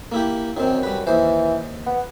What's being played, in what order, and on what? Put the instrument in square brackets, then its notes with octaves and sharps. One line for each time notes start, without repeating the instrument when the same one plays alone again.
[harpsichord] A#3 E4 G4
[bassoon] F#2 [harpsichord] D#3 C4
[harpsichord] G3 B4
[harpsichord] D#2 C5 [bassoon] E3
[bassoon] B3